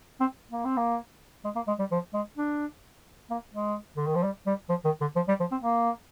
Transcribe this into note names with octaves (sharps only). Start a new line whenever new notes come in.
C4
A#3
C4
A#3
G#3
A#3
G#3
G3
F3
G#3
D4
A#3
G#3
D3
D#3
F3
G3
G3
F3
D#3
D3
F3
G3
F3
C4
A#3